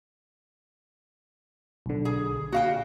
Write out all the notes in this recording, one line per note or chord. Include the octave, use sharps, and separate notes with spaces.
B1 D3
G#4
A#2 F#4 F5 G5